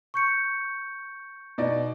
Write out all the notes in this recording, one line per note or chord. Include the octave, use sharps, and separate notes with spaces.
C#6 G6 C#7
B2 D#4 D5